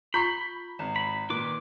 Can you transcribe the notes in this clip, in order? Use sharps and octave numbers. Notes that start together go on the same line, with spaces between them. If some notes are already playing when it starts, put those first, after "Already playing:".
F4 A#5 B5 C#6 G6 C7
G#1
B5
A#2 D#3 B4 D6